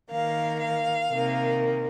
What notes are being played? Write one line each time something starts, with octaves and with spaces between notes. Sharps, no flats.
D#3 A#3 F5
F5
C3 D#3 A#3